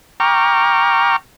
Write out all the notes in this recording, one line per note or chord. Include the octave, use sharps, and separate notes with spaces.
G5 A#5 C#6 D6 F6